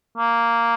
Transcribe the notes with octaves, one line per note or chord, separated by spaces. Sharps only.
A#3